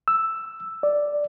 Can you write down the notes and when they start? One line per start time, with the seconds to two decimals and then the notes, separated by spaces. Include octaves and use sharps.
0.08 E6
0.83 D5